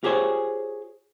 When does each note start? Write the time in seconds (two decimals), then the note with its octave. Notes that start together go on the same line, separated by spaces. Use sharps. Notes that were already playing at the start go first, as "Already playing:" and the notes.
0.03 F4 G4 G#4 C5 C#5